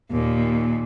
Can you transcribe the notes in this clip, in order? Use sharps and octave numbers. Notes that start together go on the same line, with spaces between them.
D#2 A#2